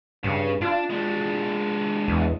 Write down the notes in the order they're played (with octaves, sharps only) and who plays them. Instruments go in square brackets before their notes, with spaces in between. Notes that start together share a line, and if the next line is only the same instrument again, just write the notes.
[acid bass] G2 [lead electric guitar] C#3
[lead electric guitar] D4 [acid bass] F4
[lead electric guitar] G#3 D4
[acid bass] E2